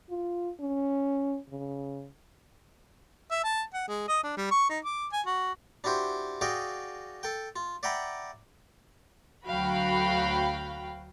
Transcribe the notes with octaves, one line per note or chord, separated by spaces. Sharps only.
F4
C#4
C#3
E5
A5
F#5
G#3
D#5
D4
G3
C#6
D#4
D6
G#5
F#4
D4 E4 F#4 G4 C5
F#4 G#4 D5 D#5 F5 G5
A4 G5
F4
D5 E5 F#5 G5 A#5 B5
D2 F#3 F#4 F5 G5 B5